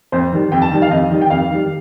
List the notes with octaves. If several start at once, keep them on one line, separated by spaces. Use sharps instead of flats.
F2 C5
D#3 G3
F2 G5
A5
D#3 G3
F5
F2 D#5
D#3 G3
G5
F2 F5
D#3
G3